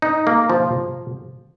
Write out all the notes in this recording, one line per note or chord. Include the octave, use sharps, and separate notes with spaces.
D#4
A#3
F3